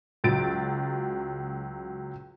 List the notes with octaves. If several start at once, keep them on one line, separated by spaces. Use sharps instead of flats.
C#2 F#3 A6 D7